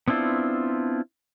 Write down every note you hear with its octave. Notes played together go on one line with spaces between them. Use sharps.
B3 C4 D4 E4 F4